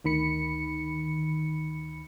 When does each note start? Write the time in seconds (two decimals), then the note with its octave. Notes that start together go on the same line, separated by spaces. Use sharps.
0.04 D2 D#3 B5 C#7